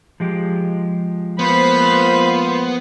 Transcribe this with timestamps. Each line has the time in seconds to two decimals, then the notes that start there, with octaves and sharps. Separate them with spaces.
0.20 F3 G#3 G4
1.39 A#3 B3 F4 C5 B5